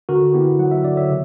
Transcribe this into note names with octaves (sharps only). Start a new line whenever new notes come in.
D3 F#4 A#4
B3 E4 G4
F#3 F#5
E5
D3 D5
C#5 E5
C#3